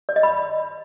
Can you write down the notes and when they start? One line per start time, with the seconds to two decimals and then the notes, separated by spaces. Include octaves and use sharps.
0.09 D5
0.16 D#5
0.23 B5